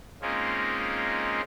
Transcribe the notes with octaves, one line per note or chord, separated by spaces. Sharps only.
G#3 A#3 C4 C#4 D#4 F4